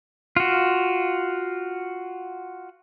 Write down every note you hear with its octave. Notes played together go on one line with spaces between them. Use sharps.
F4 F#4